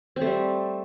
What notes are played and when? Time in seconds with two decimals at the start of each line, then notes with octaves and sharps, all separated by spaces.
0.16 C4
0.21 A3
0.26 G3